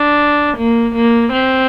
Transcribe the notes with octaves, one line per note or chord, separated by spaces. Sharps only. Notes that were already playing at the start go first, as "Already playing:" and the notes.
Already playing: D4
A#3
A#3
C4